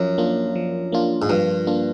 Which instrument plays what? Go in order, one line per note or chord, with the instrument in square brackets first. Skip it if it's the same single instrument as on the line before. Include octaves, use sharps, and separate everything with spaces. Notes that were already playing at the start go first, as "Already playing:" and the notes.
Already playing: [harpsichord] F#2 [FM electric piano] F3 F4
[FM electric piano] A#3 D4 F4
F3
A#3 D4 F4
[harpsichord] G#2
[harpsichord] G2 [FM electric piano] F3
[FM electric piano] A#3 D4 F4